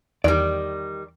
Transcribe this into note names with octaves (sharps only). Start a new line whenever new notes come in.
E2 D#3 G3 D5